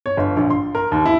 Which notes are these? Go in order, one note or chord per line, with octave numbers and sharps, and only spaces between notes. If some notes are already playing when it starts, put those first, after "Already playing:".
C#5
G1
A#1
C6
A#4
D#2
E4